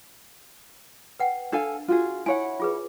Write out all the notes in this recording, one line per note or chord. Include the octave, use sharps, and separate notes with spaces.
B4 F#5 G5
D4 A4 F5 G#5
F4 F#4 G#4
E4 C#5 F#5 G#5
F4 G#4 B4